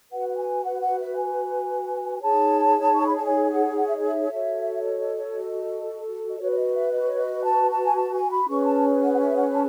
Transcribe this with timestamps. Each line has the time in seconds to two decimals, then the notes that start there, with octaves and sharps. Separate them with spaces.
0.11 F#4 B4 F#5
0.29 F#5
0.37 G#5
0.64 F#5
0.80 F#5
0.98 E5
1.15 G#5
2.20 D#4 G#4 C#5 A5
2.96 C#6
3.07 B5
3.16 A5
3.25 G#5
3.51 F#5
3.77 F#5
3.87 E5
3.95 D#5
4.05 E5
4.30 F#4 A4 C#5
4.82 D#5
5.00 D#5
5.16 C#5
5.34 D#5
6.30 D#5
6.39 F#4 B4 C#5
6.51 C#5
6.57 D#5
6.74 E5
6.91 D#5
7.07 C#5
7.18 D#5
7.43 A5
7.70 A5
7.84 G#5
7.95 A5
8.13 G#5
8.30 B5
8.48 C#4 G#4 B4 C#6
8.66 A5
9.01 F#5
9.13 F#5
9.18 E5
9.36 F#5
9.53 A5